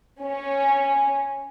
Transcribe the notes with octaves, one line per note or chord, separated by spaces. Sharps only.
C#4